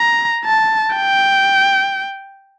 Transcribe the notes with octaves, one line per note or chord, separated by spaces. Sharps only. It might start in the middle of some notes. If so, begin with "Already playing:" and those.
Already playing: A#5
A5
G5